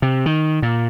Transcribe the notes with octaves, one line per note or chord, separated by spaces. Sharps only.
C3
D#3
A#2